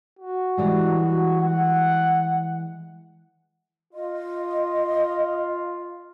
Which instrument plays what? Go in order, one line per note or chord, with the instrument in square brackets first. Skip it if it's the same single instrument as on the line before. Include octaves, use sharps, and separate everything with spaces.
[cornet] F#4
[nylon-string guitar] E3 G3 G#3
[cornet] F#4
F#5
[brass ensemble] F4 [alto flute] D#5